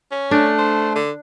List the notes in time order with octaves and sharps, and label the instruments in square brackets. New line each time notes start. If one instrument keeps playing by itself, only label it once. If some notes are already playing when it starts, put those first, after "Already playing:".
[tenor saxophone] C#4
[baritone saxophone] A3 [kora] D4
[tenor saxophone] C5
D3